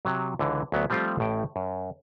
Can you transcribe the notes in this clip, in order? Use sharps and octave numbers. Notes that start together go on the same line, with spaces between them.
C3 F#3
C#2 D3 E3
D2 F#3 B3
F3 G3 A3 C4 F4 G4
A1 A2 G5
F#2